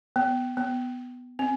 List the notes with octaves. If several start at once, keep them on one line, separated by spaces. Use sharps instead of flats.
B3
B3
C4